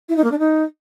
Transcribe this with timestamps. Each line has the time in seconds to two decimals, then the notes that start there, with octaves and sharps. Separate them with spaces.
0.09 E4
0.16 D#4
0.24 A#3
0.31 D4
0.39 D#4